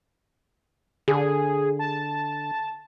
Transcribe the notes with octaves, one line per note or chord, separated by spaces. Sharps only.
D3 G#4
A5